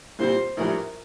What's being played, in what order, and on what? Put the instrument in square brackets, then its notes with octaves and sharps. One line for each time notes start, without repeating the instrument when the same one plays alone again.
[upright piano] C2 A#2 G3 C4 [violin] C5
[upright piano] A#1 A2 E3 G3 [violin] A#4